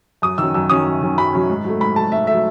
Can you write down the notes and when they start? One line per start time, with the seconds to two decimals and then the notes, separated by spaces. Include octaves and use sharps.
0.22 F#2 D#6
0.38 D#3 F#3 C#4 E6
0.54 F#2 E6
0.69 D#3 F#3 C#4 D#6
0.86 F#2
1.01 D#3 F#3 C#4
1.18 F#2 B5
1.33 D#3 F#3 C#4
1.49 G#2
1.64 F#3 A3
1.80 G#2 B5
1.96 F#3 A3 A5
2.12 G#2 E5
2.27 F#3 A3 E5